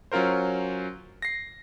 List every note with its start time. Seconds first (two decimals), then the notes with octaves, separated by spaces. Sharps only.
0.12 F#3 C#4 F4 A#4 C5
1.22 A#6 C7